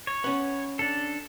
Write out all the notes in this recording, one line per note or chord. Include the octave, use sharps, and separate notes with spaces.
C#5
B3 C#4
D4 A4